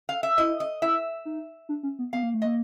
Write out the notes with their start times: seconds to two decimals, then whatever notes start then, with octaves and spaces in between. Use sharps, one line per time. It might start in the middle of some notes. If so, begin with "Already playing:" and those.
0.09 F5
0.23 E5
0.38 E4 D#5
0.60 D#5
0.82 E4 E5
1.25 D#4
1.69 D4
1.83 C#4
1.99 B3
2.13 B3 F5
2.23 A#3
2.34 A3
2.42 A#3 D#5